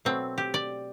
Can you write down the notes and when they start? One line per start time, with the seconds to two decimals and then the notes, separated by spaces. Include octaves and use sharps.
0.05 B2 F#3 A3 C4
0.38 G4
0.54 D5